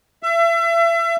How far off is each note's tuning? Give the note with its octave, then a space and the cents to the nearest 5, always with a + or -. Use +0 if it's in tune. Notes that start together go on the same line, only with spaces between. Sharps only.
E5 +35